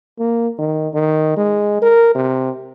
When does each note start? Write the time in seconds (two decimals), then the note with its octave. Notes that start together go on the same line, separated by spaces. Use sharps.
0.19 A#3
0.58 D#3
0.94 D#3
1.37 G#3
1.82 A#4
2.15 C3